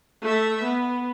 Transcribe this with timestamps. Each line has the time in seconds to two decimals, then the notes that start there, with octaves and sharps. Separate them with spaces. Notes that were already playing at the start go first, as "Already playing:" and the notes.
0.22 A3 E5
0.63 B3